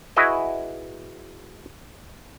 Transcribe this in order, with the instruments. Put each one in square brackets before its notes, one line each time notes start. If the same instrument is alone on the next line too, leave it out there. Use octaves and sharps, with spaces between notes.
[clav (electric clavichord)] E4 F#4 G#4 B4 D#5